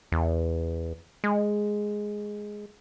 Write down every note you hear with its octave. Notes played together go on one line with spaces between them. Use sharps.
E2
G#3